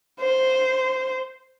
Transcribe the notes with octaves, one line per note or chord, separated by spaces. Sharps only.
C5